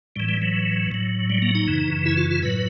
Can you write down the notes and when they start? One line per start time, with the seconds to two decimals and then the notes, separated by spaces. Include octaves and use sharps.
0.16 A2 E3 G3
0.29 G3
0.42 F#3
0.92 A2 F#3
1.30 G3
1.42 A#3
1.55 D#4
1.68 F#2 C#3 E3
2.06 E4
2.17 F4
2.31 F4
2.43 A2 F#3 B4